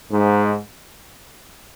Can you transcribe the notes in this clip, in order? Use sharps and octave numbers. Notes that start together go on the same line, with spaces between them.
G#2